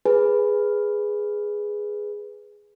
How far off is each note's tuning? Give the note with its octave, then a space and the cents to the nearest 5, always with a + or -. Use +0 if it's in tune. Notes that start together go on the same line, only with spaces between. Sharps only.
G#4 +0 B4 +0 G#5 +0